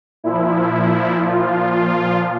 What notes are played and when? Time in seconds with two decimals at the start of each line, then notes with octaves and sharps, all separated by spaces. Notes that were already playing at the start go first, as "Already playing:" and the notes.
0.24 A#2 F3 E4
1.26 F4